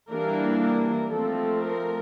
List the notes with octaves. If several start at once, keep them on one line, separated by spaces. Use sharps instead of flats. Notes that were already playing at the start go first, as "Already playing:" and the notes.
E3 G3 A#3 D4 A#4
A#4
F3 A3 C4 A4
A#4